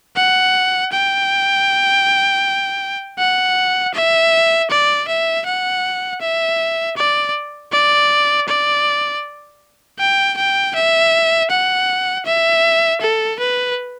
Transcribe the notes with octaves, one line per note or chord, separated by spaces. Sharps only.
F#5
G5
F#5
E5
D5
E5
F#5
E5
D5
D5
D5
G5
G5
E5
F#5
E5
A4
B4